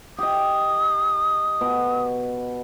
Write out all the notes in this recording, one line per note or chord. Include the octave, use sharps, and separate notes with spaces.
G4 D#5 D#6
B2